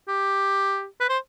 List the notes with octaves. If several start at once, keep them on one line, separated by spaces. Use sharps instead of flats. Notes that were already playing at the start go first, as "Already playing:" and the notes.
G4
B4
C5